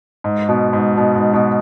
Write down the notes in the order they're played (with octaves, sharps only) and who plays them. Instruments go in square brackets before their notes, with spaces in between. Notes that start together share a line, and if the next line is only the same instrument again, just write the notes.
[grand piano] G#2
B2
G#2
B2
G#2
B2